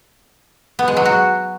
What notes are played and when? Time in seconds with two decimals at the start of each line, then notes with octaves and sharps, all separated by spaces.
0.79 B3
0.88 G#3
0.97 F#3
1.05 F#4